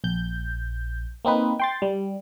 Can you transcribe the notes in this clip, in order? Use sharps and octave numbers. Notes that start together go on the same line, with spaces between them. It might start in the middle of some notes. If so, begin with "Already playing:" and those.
A#1 G6
A#3 C4 D#4 B4
G5 C6 A6
G3